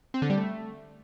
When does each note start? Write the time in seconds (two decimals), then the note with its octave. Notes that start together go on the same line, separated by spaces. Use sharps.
0.14 C4
0.22 D3
0.30 G3
0.38 A3